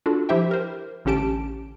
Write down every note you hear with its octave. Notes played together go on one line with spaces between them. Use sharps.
D4 F4 F#4 A4
F3 E4 G4 C5 E5 G5
A#4 C5
A1 D3 C#4 G4 A5 D7